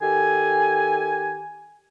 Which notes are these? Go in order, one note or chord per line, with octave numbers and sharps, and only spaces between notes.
D#3 G4 A4 G#5